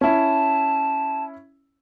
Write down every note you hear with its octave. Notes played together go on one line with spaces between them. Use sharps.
C#4 E4 A5